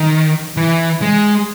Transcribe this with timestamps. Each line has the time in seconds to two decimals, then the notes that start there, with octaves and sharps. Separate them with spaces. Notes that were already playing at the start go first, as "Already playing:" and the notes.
Already playing: D#3
0.57 E3
1.02 G#3